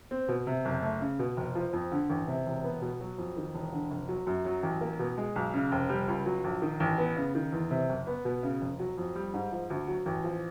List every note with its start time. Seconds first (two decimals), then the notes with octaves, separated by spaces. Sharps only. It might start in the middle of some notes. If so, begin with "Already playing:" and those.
0.11 C4
0.28 B2
0.47 C3
0.65 F#1
0.82 A3
1.01 C#3
1.19 B2
1.37 F1
1.55 F3
1.73 F2
1.92 D3
2.10 A1
2.28 C3
2.46 E1
2.64 B3
2.82 B2
3.00 F#3
3.18 F2
3.37 D#3
3.54 E1
3.73 D3
3.91 F1
4.09 F#3
4.27 F#2
4.45 F#3
4.63 A1
4.81 A#3
4.99 B2
5.18 G#3
5.36 B1
5.54 C#3
5.72 F1
5.89 G3
6.08 C#2
6.26 F#3
6.44 A#1
6.62 D#3
6.80 A1
6.98 B3
7.17 C#3
7.35 D#3
7.52 E2
7.71 C3
7.89 F#1
8.07 B3
8.25 B2
8.43 C#3
8.61 F1
8.80 F#3
8.98 F2
9.15 G3
9.34 G#2
9.52 F3
9.70 D2
9.88 F#3
10.06 A1
10.24 F3